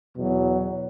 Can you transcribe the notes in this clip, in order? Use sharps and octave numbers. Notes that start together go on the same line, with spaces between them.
E2 B2 F#3